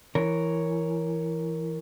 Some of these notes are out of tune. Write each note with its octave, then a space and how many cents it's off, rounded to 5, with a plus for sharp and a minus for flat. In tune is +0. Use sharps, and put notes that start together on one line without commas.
E3 +10 A#4 +0 C#5 +0